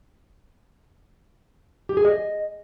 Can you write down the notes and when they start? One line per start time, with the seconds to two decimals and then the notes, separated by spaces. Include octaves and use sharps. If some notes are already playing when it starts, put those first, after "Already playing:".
1.89 G4
1.97 G#4
2.05 D#5